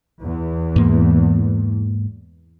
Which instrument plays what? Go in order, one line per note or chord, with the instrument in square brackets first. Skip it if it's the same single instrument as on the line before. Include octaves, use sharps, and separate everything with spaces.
[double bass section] E2
[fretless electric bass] G#2 A#3